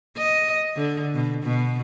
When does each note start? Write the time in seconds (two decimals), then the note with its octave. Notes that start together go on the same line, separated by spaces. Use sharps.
0.17 D#5
0.76 D3
1.14 B2
1.43 B2